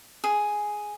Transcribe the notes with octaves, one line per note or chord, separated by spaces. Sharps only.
G#4